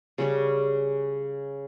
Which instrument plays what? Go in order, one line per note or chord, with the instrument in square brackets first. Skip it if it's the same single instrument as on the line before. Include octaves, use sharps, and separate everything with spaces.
[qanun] C#3 G3 C#4